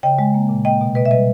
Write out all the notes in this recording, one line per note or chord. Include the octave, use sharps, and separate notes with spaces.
C#3 D#5 G5
G#3
A#3
A#2
A#3 D#5 G5
B2
B2 B4 D#5
E5
G3 B4 D#5